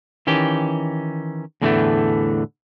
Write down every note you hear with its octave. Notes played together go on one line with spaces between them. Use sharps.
D#3 E3 C#4 G4
E2 A2 D3 E3 G#3 A3